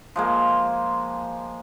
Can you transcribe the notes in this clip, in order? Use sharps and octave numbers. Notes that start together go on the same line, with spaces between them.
F3 G#3 A#3